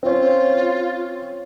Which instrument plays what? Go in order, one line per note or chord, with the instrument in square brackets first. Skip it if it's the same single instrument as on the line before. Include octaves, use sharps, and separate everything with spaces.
[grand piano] C4 C#4 [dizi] F4